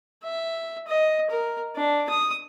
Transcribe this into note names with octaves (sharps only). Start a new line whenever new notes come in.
E5
D#5
A#4
D4
D#6